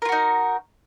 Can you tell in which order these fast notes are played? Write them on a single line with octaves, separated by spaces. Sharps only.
A#4 F4 F#4 D#4